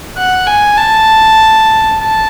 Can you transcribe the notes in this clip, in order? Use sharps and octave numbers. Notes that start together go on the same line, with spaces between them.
F#5
G#5
A5
A5